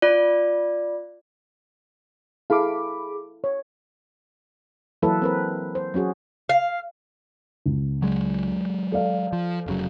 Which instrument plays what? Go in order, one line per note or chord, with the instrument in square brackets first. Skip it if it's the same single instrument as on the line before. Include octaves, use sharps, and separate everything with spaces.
[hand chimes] F4 D5
[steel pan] E4 A4 F5 [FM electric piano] G#4 B5 D6
[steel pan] C#5
[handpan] E3 F#3 A#3 E4 A4 B4
C4 A#4 B4
C5
F#3 C#4 F#4 G#4
[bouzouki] F5
[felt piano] C#2
[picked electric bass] F#3 G#3
[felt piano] A4 D5 F5
[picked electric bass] F3
F1 C#3 F#3